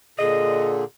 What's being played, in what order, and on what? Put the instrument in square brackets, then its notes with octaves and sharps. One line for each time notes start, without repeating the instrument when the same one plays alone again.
[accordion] A#2 D3 [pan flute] G#4 [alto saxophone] D#5